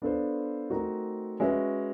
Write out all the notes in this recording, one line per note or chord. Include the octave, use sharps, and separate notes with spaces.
B3 D4 F4 A4 C5
A3 C4 D#4 F#4 A#4
G#3 C#4 F#4 B4 E5